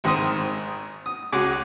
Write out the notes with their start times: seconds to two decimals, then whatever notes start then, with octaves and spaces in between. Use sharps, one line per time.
0.04 G#1 G#2 D#3 C4 C5 D#6
1.06 D#6
1.32 C#2 F#4 G#4 D6